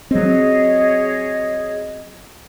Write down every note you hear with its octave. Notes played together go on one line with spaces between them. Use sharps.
F#3 C4 G#4 C#5 D#5